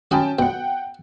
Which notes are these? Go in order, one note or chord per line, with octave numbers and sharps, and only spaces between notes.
C#4 F#4 G5 A5 D#6
B2 F#5 G5